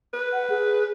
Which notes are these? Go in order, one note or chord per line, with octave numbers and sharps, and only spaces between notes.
B4
F#5
G#4